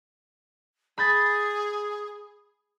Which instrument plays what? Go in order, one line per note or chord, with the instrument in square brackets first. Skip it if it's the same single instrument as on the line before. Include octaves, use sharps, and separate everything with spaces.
[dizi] G#4 [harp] B5 G6 A6